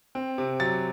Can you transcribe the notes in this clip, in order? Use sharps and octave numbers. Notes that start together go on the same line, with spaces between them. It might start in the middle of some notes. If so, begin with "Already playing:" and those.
C4
C3
F#3 A6